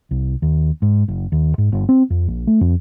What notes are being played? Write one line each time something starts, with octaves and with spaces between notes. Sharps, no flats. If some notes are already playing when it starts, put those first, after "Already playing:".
C2
D#2
G#2
F#1
D#2
G#2
G1
C4
F2
A#1
A3
F2